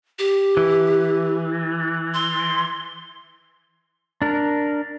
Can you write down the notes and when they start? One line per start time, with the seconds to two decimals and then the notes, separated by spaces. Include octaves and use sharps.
0.19 G4
0.57 E3
2.14 C6
4.22 D4 A#4